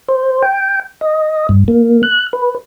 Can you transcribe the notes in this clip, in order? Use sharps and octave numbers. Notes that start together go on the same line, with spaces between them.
C5
G5
D#5
G2
A#3
F#6
B4